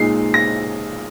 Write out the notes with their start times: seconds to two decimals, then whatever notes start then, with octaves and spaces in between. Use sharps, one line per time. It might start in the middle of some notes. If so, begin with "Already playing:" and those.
Already playing: A#2 G#3 D#4 C7
0.34 A#6